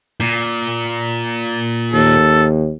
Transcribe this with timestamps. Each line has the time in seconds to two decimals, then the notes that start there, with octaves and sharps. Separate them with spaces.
0.20 A#2
1.94 D#2 A4